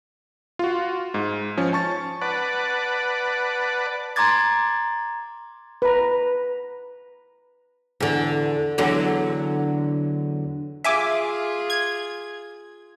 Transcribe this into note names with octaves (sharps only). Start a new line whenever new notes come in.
F4 F#4
G#2
F3 C#4
A5 C#6 A6
B4 D5 F#5 A5
A#5 C6 D6 G#6 A6
B4 A#5
E2 D3
E2 D3 F#3
F4 G#4 E5 G#5 D6
G#6